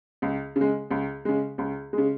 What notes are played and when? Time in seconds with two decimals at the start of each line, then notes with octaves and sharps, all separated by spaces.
0.22 C#2
0.56 C#3
0.61 G#3
0.91 C#2
1.25 C#3 G#3
1.58 C#2
1.93 C#3 G#3